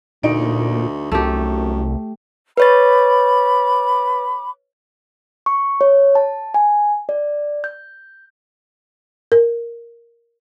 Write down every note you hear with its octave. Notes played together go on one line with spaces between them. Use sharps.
D2 A#2 D#4 D7
C2 F#2 A3 G4
B4 C#5 B5 D6 A6
C#6
C#5
A5
G#5
D5
G6
A#4